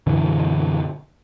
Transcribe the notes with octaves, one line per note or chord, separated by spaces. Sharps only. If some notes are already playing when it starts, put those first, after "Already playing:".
F#2 B2 D3 E3